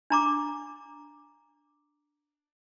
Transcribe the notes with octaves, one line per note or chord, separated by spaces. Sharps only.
D4 A#5 D6